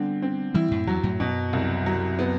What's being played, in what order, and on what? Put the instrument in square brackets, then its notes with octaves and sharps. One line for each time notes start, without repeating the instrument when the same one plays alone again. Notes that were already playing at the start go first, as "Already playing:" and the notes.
Already playing: [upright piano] D3 C4 [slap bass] G3 B3
[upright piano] C4
[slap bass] E3 G3 [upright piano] E4
[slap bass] F#2 A2
[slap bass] E2 G2 [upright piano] F#3
[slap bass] F#2 A2
[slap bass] F#2 [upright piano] B2
[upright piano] C2
F#3
B3